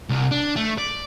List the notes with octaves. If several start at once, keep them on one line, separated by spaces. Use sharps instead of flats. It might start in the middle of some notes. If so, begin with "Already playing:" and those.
C2
D4
A3
D5